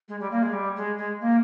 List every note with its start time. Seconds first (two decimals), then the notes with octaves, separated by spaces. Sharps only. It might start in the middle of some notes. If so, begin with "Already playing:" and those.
0.08 G#3
0.20 G3
0.32 A#3
0.43 G#3
0.53 G3
0.76 G#3
0.97 G#3
1.21 A#3